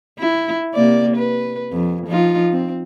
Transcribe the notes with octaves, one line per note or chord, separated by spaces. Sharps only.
E4
C3 A#3 D5
B4
F2
F3 D#4 F4
C4